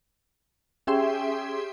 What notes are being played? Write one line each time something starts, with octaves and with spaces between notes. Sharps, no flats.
C#4 G4 G#4 E5 G5 C6